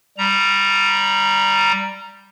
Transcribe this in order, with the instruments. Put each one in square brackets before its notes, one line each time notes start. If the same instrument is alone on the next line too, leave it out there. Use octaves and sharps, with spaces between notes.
[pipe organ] G3 A#5